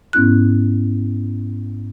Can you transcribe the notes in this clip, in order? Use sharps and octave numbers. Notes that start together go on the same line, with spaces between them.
G#2 B3 C#4 E4 F#6